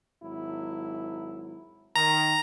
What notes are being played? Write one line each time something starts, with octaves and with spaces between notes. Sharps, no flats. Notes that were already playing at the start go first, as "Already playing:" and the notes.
G#1 F#3 E4
D#3 A#5